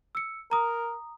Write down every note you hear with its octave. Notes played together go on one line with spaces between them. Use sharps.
E6 C#7
A#4 A#5 D#6